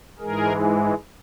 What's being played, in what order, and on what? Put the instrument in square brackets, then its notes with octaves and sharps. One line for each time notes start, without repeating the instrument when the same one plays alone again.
[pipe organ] G#2 E3 G#3 G#4 A#4